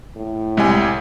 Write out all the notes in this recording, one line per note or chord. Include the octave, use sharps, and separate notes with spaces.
A2
C2 G3 G#3 G#5